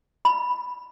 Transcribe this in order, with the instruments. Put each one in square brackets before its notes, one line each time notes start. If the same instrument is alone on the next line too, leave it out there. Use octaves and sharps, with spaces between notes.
[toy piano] B5